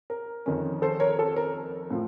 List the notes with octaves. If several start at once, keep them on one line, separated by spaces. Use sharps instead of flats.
A#4
F2 D#3 A#3 C#4
A4 C5
A#4 C#5
A4
A#4
A2 F3